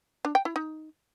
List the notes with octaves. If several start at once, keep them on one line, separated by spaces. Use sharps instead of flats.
D4
G5
E4
D#4